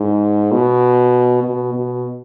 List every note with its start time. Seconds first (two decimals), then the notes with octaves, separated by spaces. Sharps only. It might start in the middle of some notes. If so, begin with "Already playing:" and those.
Already playing: G#2
0.52 B2
1.43 B2
1.73 B2